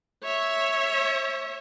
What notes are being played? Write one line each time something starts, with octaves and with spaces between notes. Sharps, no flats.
C#5 E5